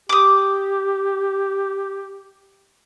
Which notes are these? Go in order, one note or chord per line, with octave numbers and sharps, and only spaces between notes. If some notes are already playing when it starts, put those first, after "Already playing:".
G4 D6 D#6